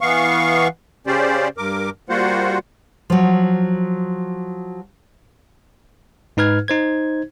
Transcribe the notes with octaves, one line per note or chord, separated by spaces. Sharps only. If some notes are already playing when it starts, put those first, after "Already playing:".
E3 B3 F5 C#6
C#3 C#4 G4 C5 D5
G2 A#4 D6
G3 A#3 F4 F#4 C5 F#5
F3 F#3
G#2 D#4 B4 F6 G#6
D#4 C5 G#6